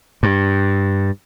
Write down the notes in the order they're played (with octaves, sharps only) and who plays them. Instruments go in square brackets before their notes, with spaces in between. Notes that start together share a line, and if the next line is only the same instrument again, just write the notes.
[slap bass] G2